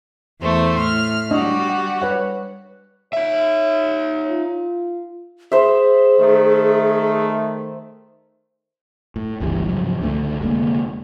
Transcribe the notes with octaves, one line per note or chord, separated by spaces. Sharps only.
E2 A3 C5
A2 C6 F6
G3 D4 F#4 D#5
F#5
B4 C#5 F#5
D#4 C#5 E5
F4
G#4 C5 E5
D#3 A3
A2
G1 C#2 E3 G3
G#2 C#3 F3 F#3
C#2 D3 G3 A3
F1 D3 G#3 A#3